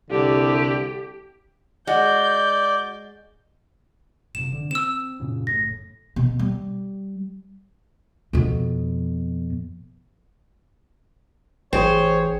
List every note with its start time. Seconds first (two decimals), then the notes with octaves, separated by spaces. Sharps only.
0.10 C2 D3 G4
1.87 G#3 F#4 D5 G6
4.35 F#1 C3 E7
4.52 D3
4.71 C4 E6 E7
5.20 F#2 A#2 C#3
5.47 F#1 A2 A#6
6.16 B2
6.39 G3
8.33 F2 B2
11.73 A1 G#4 C5 C#5 G5